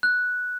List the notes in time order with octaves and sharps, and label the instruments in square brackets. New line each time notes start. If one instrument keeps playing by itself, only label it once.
[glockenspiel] F#6